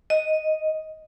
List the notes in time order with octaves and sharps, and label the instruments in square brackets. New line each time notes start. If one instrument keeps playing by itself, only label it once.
[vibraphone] D#5